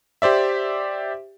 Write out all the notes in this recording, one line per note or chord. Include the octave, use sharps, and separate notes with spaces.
G4 C5 D5 E5